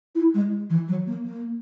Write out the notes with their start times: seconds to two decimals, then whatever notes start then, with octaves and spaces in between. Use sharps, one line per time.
0.15 E4
0.34 G#3
0.70 E3
0.88 F#3
1.07 A#3
1.25 A#3